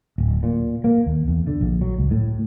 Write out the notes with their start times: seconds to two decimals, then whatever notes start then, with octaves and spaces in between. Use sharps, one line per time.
0.18 D1
0.43 A#2
0.84 A#3
1.06 D#2
1.28 E2
1.47 D3
1.61 A#1
1.81 F#3
1.98 C#2
2.11 A2